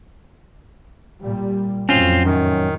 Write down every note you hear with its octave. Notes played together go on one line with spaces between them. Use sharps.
A#2 G3
F2 A2 F#3 C4 C#4 F4
F#2 D#3